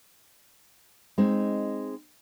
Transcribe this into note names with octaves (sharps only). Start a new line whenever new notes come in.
G#3 C4 D#4